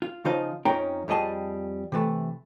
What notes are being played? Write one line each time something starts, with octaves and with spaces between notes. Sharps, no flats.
F4
C#3 F3 D#4 C5 D#5 F5
F2 C#4 D#4 A#4 G5 A#5
F2 G3 G#4 D#5 A5
C3 E3 A3